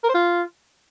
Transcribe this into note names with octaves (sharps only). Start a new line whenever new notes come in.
A#4
C5
F4